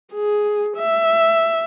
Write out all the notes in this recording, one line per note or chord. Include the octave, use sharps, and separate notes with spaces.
G#4
E5